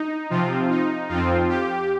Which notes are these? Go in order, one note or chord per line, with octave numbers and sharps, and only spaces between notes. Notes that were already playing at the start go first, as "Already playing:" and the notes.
Already playing: D#4
C3 F3 C4 F4
D#4
F2 F3 C4 F4
G4